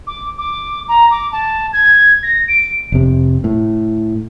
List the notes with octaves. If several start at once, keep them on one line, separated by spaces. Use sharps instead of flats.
D6
D6
A#5
D6
A5
G#6
A#6
D7
F1 C3
A2